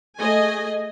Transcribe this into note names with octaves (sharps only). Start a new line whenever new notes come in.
A3 G#4 D#5 G#5